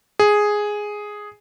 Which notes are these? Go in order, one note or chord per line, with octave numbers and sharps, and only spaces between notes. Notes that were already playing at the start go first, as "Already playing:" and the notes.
G#4